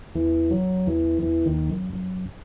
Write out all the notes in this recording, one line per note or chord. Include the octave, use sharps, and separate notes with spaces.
E2 E3
F#2 F#3
E2 E3
E2 E3
D#2 D#3
F#2
F#2